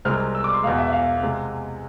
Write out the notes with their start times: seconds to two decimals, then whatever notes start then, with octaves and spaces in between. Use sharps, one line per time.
0.05 C2 C3 G#3 C4 F6
0.35 E6
0.44 D6
0.54 C6
0.63 E2 B2 G#3 F5
0.78 E5
0.88 E5
0.92 F5
1.23 C3 G#3